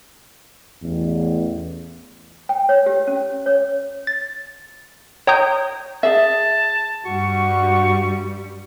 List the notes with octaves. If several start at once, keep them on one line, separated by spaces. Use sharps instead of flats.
A1 E2
G5
C#5
G4
C#4
C#5
A6
C#5 G5 A#5 D#6 G6
G#4 E5 A5
G2 G3 F#4 C#6